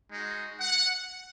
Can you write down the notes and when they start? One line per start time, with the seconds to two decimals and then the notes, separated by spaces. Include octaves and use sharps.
0.10 G#3 D#4 F#4
0.60 F#5